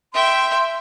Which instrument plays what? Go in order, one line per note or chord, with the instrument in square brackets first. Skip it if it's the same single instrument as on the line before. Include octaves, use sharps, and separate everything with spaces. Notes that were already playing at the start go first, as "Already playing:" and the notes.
[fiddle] E5 G5 [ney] C6